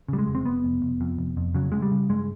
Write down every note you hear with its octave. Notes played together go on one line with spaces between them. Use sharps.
C#3 G3
G#3
F1
C4
F1 B3
F1
F1
F2
F1
F2
C#3 F#3
C#3 G#3
G3
C#3
G2 G#3